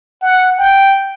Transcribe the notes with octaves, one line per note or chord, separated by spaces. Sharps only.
F#5
G5